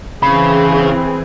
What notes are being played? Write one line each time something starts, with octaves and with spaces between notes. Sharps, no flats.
C#3 E3 C4 G#4 B5